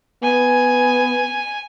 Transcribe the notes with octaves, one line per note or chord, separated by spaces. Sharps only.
B3 G#5